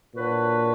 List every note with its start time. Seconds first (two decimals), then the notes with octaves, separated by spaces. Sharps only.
0.15 A#2 F#3 D4 F#4 B4